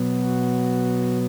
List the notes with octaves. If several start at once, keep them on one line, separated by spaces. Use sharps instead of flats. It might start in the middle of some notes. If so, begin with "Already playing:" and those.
Already playing: B2 F#3 B3
F#4